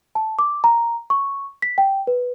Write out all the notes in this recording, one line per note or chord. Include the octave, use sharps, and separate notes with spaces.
A5
D6
A#5
C#6
B6
G5
B4